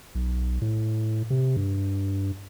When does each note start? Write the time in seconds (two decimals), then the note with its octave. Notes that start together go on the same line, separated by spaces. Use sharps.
0.15 B1
0.62 A2
1.30 C3
1.57 G2